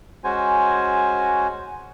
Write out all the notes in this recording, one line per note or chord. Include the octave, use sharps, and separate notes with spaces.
G#3 C#4 F#4 C5 G#5